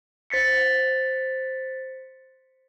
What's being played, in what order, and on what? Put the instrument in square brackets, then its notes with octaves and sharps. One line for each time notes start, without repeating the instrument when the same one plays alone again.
[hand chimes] C5 A6 B6 C#7